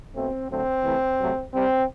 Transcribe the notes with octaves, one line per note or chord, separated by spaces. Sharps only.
B2 A3 C4
D3 F#3 A3 C4
C3 E3 A3
C3 F#3 A3
C3 G3 C4